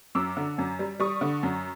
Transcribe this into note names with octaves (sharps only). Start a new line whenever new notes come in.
F#2 D6 E6
D3
F#2
G3
G3 C#6 D#6
D3
F#2